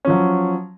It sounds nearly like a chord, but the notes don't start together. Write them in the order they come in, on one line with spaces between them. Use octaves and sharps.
C#4 F3 F#3